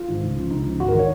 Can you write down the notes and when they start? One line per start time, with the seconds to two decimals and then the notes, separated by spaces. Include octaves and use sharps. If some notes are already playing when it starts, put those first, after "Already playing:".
Already playing: F4
0.08 G#2 D#3
0.23 C#2
0.36 C#3 F3
0.51 C#2 D#4
0.65 C#3 F3
0.80 G#1 F#4
0.88 D#3 A#4
0.99 C#5